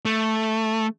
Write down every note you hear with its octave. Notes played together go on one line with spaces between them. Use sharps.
A3